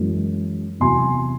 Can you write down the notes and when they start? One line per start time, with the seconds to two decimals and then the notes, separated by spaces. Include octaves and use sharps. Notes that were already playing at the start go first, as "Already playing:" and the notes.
Already playing: F#2 E3 G#3
0.80 E2 C3 F#3 G#5 C6